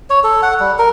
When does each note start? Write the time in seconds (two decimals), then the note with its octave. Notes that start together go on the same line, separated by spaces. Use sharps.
0.10 C#5
0.24 A4
0.42 F#5
0.60 G3
0.79 A#4